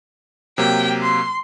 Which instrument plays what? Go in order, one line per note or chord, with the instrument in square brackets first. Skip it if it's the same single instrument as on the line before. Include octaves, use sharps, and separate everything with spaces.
[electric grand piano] C3 F#3 A#3 [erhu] G5
[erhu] C6